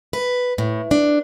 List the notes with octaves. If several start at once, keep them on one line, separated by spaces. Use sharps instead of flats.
B4
A2
D4